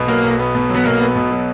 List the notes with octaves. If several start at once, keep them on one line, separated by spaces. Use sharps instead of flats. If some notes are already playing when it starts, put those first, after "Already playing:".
Already playing: B1 B2 B3
F#3 A#3
B1
B3
B2
F#3
B3
B1 A#3
B3
B2
F#3